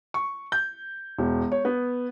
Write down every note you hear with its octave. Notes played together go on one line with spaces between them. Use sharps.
C#6
G6
E1
C#5
B3